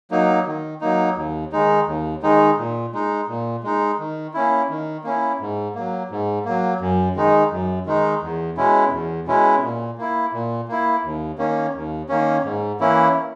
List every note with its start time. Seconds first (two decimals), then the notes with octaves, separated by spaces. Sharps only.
0.11 F#3 A#3 D#4
0.46 D#3
0.81 F#3 A#3 D#4
1.17 D#2
1.52 D#3 G#3 D#4
1.87 D#2
2.22 D#3 G#3 D#4
2.58 A#2
2.93 G#3 D#4
3.28 A#2
3.63 G#3 D#4
3.99 D#3
4.34 A#3 C#4 E4
4.69 D#3
5.04 A#3 C#4 E4
5.40 G#2
5.75 F#3 A#3
6.11 G#2
6.45 F#3 A#3
6.81 F#2
7.16 D#3 G#3 D#4
7.51 F#2
7.86 D#3 G#3 D#4
8.22 E2
8.57 B2 G#3 C#4 E4
8.92 E2
9.27 B2 G#3 C#4 E4
9.63 A#2
9.98 A#3 E4
10.33 A#2
10.68 A#3 E4
11.04 D#2
11.38 D#3 A#3 C#4
11.74 D#2
12.09 D#3 A#3 C#4
12.44 G#2
12.80 E3 A#3 C#4 E4